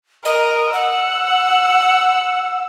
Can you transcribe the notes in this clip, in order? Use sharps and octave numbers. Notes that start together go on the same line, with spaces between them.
A#4 D#5
F#5 E6